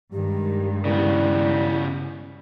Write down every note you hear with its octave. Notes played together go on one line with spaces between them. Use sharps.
G2 D#3 G#3 G4
C#3 G3 B3 E4